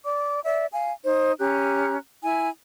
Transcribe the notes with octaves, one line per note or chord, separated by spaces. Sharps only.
D5 D6
D5 E5
F5 G#5
D#4 C5
C#4 G4 A#5 F#6
E4 G#5